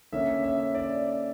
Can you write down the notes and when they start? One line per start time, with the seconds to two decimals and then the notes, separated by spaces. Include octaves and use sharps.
0.12 D3 A#3 C#4 E5
0.43 E5
0.74 D5